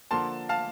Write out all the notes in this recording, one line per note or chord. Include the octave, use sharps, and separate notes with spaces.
D3 F3 A#3 A5 C6
F5 A5